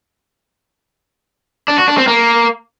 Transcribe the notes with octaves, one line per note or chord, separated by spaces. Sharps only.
D4
F#4
D4
C4
A#3